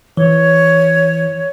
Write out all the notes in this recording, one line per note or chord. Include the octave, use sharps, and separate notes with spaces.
E3 C#5